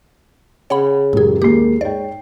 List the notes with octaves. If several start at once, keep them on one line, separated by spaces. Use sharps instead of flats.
C#3 C#5 F#5 B5
C#2 F#2 A2 G4 G#4
D#2 G#3 A#3 G4 C7
G#2 C#5 D5 G5